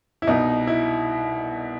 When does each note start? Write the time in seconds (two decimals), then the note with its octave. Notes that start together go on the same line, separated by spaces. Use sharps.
0.22 E4
0.27 C2 B2 D#4
0.67 E4